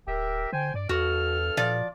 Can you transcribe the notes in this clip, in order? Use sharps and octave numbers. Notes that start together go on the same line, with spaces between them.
D1 G4 A#4 E5
D3 C5 G5 G#5
G2 D5
E2 G2 F#4 A4 F6
A#2 F3 D5